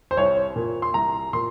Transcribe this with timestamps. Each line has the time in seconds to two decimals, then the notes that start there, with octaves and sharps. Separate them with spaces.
0.11 C5
0.17 C2 C#5
0.56 A#2
0.82 C6
0.94 C2 A#5
1.33 A#2 C6